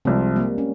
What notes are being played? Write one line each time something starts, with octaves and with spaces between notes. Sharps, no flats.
C2 C3 F3 G#3 C4
G3 A#3
C#4